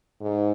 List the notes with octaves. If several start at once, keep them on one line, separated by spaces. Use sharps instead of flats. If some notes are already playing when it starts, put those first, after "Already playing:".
G#2